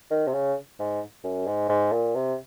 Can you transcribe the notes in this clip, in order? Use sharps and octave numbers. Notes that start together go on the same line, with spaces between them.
D#3
C3
C#3
G#2
F#2
G#2
G#2
A#2
C3